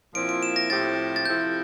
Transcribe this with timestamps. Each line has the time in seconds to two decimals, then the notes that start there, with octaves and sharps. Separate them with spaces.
0.14 A#2 F3 C4 E4 D7
0.29 D7
0.43 E7
0.56 A#6
0.70 A2 F3 C4 E4 G4 A6
1.16 A6
1.25 C3 F3 C4 E4 A4 G6